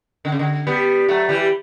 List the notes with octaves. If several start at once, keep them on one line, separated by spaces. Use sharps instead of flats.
D3
C#3
D3
G3 B3
F#3 A3
E3 G3